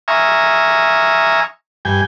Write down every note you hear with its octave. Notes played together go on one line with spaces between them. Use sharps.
E5 G#5 A#5 C#6 D#6 F6
G2 G5 G#5